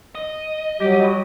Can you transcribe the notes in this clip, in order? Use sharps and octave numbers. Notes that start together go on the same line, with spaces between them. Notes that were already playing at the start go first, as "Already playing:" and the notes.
D#5
F#3 G3 G4
F#4 G5 B5 D#6